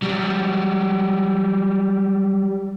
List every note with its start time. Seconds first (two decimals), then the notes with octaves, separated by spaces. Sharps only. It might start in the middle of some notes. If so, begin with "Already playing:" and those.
0.02 F#3 G3